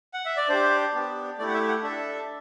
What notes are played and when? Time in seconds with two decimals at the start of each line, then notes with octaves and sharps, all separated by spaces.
0.14 F#5
0.26 E5
0.37 D5
0.49 D4 G4 C5
0.93 B3 D4 G4
1.39 A3 E4 G4 D5
1.49 F#5
1.54 E5
1.68 F#5
1.83 D4 A4 E5